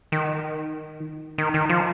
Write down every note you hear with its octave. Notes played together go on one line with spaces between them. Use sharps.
D#3
D#3
D#3
F3